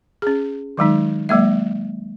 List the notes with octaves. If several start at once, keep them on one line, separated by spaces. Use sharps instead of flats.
C#4 G#4
D#3 F#3 G#3 D#4
F#3 G#3 A#3 E5